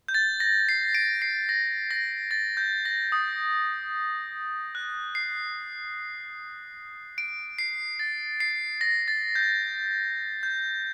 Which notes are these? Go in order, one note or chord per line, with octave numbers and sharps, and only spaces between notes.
G6
A6
A#6
C7
D7
C7
A#6
A#6
A6
G6
A#6
D#6
F#6
C7
D7
C7
A6
C7
A#6
A6
G6
G6